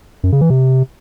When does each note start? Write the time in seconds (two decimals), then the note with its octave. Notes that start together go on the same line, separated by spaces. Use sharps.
0.24 F#2
0.32 C#3
0.41 E3
0.50 C3